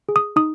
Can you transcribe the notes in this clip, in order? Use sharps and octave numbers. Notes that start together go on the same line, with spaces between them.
G#4
D#6
D#4 D#6